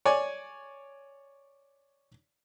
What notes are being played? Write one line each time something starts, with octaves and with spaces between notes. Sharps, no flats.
C#5 D5 G#5